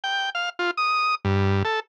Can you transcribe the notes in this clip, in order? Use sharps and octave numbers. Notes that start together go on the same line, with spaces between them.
G5
F5
F4
D#6
G2
A4